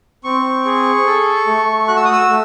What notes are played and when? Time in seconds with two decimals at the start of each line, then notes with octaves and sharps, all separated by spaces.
0.24 C4 C#6
0.65 G#4
1.06 A4
1.47 A3
1.88 F#4 F#6
1.96 E6
2.05 D#6
2.12 E6
2.29 A3